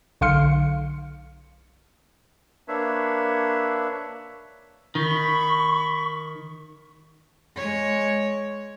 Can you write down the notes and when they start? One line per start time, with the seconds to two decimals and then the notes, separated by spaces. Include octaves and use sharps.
0.21 B1 D3 F5 C6 F6 C#7
2.68 A#3 D4 B4 C#5 E5
4.95 D#3 B5 C#6
7.56 G#3 C#5